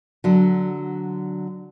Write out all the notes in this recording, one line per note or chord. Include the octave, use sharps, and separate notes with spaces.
D3 F#3